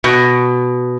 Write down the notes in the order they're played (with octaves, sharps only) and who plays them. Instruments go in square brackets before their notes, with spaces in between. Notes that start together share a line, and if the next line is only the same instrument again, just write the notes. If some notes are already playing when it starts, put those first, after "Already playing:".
[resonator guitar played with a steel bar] B2